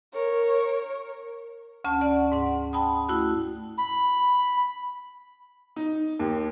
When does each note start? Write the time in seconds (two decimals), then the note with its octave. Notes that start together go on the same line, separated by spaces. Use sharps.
0.13 A#4 C#5
1.84 D2 C#4 A5
2.01 D5 F#5
2.32 G#2 F#5
2.73 G5 A5 B5 D#6
3.09 A3 E4 F#4
3.78 B5
5.76 D#4
6.19 D#2